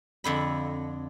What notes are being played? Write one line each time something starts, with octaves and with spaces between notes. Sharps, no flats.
F2 D3 B5